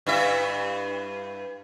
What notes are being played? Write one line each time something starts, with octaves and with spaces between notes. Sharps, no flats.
G2 E4 E5